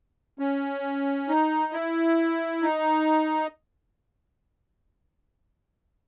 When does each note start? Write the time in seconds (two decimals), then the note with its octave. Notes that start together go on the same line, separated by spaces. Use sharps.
0.39 C#4
1.29 D#4
1.73 E4
2.62 D#4